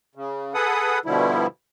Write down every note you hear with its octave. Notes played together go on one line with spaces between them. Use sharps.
C#3
G#4 A4 B4 F#5 D#6
G2 B2 D3 F3 G3 E4